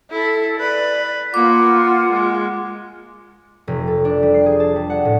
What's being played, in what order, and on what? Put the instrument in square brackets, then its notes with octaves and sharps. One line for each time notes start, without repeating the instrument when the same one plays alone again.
[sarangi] E4 [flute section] A4
[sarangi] B4 [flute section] D5
[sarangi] A#3 [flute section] F4 F#5 [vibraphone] D6
[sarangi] G#3
[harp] F1
A4
D4
G3
C7
G#4
A5
G3
F#5
A2